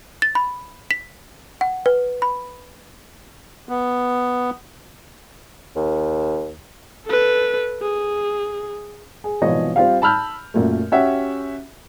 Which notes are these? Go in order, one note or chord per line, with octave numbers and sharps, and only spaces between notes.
A6
B5
B6
F#5
B4
B5
B3
D#2
A4 B4
G#4
G#4
G#1 B2 E3 F3 C#5 D#5
G3 C4 F4 G4 F5
A5 B5 E6 F6 G6
F#2 A#2 A3
C#4 F#4 G4 E5 F#5